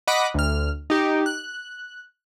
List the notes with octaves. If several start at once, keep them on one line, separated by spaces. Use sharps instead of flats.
D#5 F#5 B5 D6 F#6 B6
D2 F6
D#4 G4
F#6